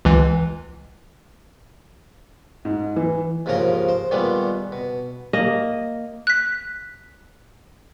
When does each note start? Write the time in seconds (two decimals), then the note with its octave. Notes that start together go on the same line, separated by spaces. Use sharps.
0.05 C#2 E3
2.65 G#2
2.96 E3
3.46 D#2 G#2 C#3 F3 A#4 A#5
3.89 C5
4.11 A#2 D#3 G3 G#3 B3
4.72 B2
5.33 A#3 D#5
6.27 F#6 B6